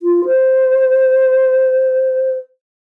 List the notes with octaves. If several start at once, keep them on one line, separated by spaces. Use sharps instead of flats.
F4
C5